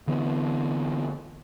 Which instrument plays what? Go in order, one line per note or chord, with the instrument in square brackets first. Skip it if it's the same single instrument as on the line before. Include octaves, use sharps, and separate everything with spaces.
[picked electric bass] D3 E3 B3